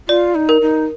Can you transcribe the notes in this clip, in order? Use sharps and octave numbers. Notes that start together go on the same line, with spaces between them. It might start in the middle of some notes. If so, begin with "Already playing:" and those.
F4 D5
D#4
A#4
D#4